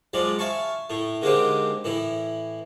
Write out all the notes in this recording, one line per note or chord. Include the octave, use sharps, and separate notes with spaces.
F3 F#3 G#3 D5
E5 F5 G#5 A5 C#6
A2 A3
D3 G#3 A#3 C4 D#4 G4
A2 E3 E4